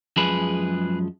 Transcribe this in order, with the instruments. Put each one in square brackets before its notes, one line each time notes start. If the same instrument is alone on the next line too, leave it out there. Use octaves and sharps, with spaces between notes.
[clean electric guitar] F#2 F3 G#3 G#4 B4